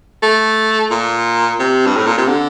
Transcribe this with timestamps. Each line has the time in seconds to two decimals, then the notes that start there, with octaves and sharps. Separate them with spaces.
0.23 A3
0.91 A#2
1.60 C3
1.86 G2
1.96 A2
2.07 A#2
2.18 C3
2.28 D3